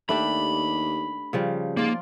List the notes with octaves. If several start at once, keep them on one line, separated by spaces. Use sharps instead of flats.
D#2 A3 D4 G4 B5
C#3 F3 G3
G#2 A#3 F4 D5